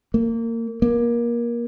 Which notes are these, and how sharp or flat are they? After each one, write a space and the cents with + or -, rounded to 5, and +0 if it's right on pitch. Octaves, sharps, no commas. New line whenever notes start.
A#3 -25
A#3 +25